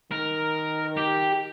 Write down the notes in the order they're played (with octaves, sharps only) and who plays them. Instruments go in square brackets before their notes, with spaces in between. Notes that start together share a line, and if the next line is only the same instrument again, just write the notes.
[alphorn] D#3 [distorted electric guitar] A#4
[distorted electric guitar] G4